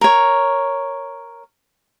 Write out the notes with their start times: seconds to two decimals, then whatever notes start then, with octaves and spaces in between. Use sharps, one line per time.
0.01 A#4 C#5